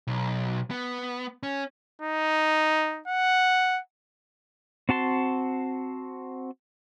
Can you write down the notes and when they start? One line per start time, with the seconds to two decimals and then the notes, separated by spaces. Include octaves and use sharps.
0.07 B1
0.71 B3
1.43 C#4
2.02 D#4
3.08 F#5
4.89 C4 F#4 A5 C6